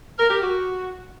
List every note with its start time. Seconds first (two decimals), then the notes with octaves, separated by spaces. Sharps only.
0.18 A#4
0.30 G4
0.42 F#4